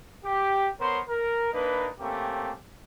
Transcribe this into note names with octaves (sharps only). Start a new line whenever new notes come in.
G4
B3 A#4 C5 C#5 C6
A#4
A#3 D4 D#4 B4
A3 A#3 C4 C#4 G4